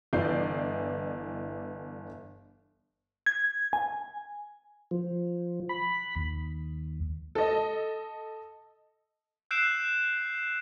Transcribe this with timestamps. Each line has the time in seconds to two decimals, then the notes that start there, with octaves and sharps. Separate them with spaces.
0.13 G1 E3 D5 D#5 G6 C7
3.26 G#6
3.73 G#5
4.91 F3
5.69 B5
6.16 D#2
7.35 A4 D#5
9.51 E6 F#6 G6 C7 D7 E7